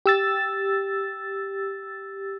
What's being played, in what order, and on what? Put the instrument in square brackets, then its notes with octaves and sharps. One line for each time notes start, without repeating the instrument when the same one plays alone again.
[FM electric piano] G4 E6 A6